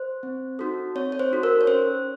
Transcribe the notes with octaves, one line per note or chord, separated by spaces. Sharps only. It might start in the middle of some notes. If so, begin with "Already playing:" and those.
Already playing: C5
C4
D#4 F#4 A4
C4 C#5
C#5
C5
D#4 F#4 A4
A#4
C#5
C#4 C5